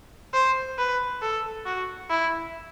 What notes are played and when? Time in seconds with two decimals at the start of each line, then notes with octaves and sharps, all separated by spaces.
0.34 C5
0.78 B4
1.22 A4
1.66 F#4
2.10 E4